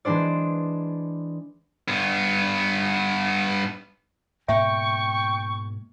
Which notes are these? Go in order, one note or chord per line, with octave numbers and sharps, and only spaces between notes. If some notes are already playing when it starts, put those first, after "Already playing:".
E3 G#3 D4 C5 D5
G2 B3
G#2 B2 A#3 E5 G5 C#6